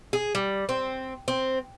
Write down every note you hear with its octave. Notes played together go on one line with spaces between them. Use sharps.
G#4
G3
C4
C4